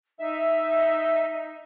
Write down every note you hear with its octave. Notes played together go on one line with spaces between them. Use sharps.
D#4 E5